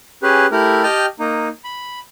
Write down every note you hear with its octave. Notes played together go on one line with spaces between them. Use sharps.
C#4 G4 G#4 B4
A3 E4 G4 A#4
G4 D#5 G5 A5 F6
A#3 D#4
B5